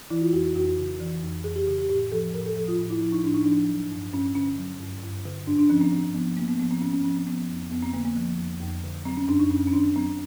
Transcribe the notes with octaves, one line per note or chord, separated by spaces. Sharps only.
E3 E4
F4
F2 F#4
F2 F#4
C#3
E3
F2
F2 G#4
G4
C#3 G4
G4
A2 G4
F3 A4
A2 A#4
A4
F3 A4
F4
A2
E4
F3 E4
D#4
A2 D4
D#4
F3 D4
F#3
G2
G2 C#4
D3 C#4
F#3
G2
G2
D3
G#2 D4
D4
F3 C#4
C4
G#2 C4
F3 B3
G#2 A#3
B3
F3 B3
C4
G#2 C#4
C#4
F3 C#4
C4
F3 B3
F2
F2 B3
C4
D3 A#3
A#3
F3
F2
F2
D3
F#3 C4
C#4
F#2 D4
D#4
F#2 C#4
C#4
D#3 D4
F#3 C4